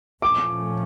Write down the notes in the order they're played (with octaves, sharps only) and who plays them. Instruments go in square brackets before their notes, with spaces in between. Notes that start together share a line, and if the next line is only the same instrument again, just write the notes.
[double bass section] A#2 F3 A3 C#4 [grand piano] D6